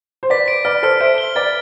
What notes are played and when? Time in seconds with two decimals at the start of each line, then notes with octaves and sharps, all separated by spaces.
0.23 C5
0.30 B4 D5 B6
0.48 D7
0.65 B4 D5 F6
0.83 A4 C5 F6
1.00 C5 E5 D7
1.18 G7
1.35 B4 D5 A6